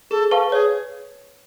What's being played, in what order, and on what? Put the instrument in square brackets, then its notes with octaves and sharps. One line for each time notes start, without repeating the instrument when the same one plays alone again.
[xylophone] G#4 [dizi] A4
[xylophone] B4 F5 A5 C#6
[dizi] A4
[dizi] G#4 [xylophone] C#5